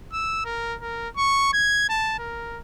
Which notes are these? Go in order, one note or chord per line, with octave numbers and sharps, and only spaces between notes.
E6
A#4
A#4
C#6
G#6
A5
A#4